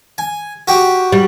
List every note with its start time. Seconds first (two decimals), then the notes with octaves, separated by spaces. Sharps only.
0.18 G#5
0.68 F#4 G4
1.12 G3